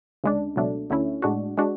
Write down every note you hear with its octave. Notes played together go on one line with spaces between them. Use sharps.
D2 C#3 G#3 D4
C#2 B2 F#3 A3 D4
D2 D3 A3 C#4 E4
A2 G#3 D4 F#4
G#3 D4 F#4